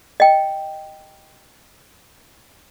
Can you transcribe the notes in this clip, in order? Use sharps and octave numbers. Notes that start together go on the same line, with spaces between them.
D#5 G5